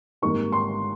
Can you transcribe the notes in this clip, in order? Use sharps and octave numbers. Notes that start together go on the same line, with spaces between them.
G#1 G#2 G3 A#3 D#4 C#6
C6